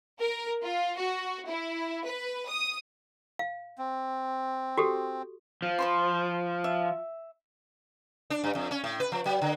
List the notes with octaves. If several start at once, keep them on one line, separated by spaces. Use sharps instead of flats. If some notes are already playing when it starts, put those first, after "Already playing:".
A#4
F4
F#4
E4
B4
D#6
F5
C4
F#4 G4 A4
F3
C5 B5 C6
E5
D4
G2
F2
C#4
A2
B4
F3
F#3
D3